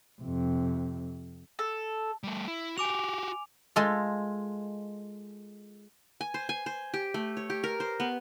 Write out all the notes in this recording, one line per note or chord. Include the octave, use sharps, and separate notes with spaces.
F2 C3
A4
G3 A3
E4
F#4 G4 G#5 D6 F7
G#3 F4 A4
G#5
C5
G#5
C5
G4
A3
C#5
G4
A#4
C5
B3